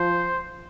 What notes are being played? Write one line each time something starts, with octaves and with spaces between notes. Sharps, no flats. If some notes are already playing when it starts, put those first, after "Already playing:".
Already playing: F3 C5